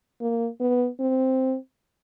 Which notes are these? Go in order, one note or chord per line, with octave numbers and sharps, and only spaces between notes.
A#3
B3
C4